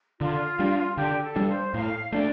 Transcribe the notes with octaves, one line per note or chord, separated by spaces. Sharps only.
D3 F4
G3 D4
D3 G4
A4
G3 D4
C5
A2 F5
A3 D4 D5